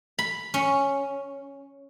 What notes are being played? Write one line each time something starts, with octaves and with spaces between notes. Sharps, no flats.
B5
C#4